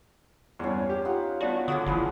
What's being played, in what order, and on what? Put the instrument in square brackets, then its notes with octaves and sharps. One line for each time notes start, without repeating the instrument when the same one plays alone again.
[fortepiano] E2 G2 [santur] C#4 C5
[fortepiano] G4
[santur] D#4 F4 F#5
[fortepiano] B3 D4 [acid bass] F#4 [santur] A5
[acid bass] D3 [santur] G#4 D5 F#5 [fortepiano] D#6
[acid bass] F#1 [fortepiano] E3 F3 [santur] G#4 B4 C5